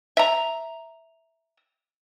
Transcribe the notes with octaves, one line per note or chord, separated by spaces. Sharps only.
E5 A#5